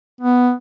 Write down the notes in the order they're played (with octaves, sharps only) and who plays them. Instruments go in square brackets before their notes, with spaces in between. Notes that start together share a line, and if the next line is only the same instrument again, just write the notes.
[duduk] B3